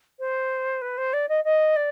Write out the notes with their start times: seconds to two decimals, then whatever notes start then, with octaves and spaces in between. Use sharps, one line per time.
0.19 C5
0.82 B4
0.98 C5
1.13 D5
1.29 D#5
1.44 D#5
1.76 D5